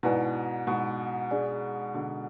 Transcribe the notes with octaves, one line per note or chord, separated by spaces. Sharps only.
G#2 B2 E4 B4 D5 G#5
G#2 B2
D4 G#4 D5 G#5
B2 D3